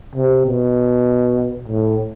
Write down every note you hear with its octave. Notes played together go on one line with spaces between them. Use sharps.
C3
B2
A2